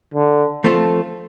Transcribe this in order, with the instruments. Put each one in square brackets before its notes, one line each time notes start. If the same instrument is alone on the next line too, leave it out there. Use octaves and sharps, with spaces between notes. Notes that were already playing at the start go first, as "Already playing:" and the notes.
[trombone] D3
[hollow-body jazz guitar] F3 A3 C4 F4 A4